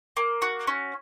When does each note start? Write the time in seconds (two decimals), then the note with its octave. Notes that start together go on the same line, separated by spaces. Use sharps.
0.17 A#3
0.42 F#4
0.67 C#4